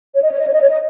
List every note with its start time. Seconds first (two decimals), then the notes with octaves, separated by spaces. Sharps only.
0.15 C#5
0.23 D#5
0.30 C#5
0.39 D#5
0.46 C#5
0.53 D#5
0.61 C#5
0.69 D#5